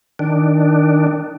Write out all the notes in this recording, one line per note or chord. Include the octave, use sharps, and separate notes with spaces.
D#3 D4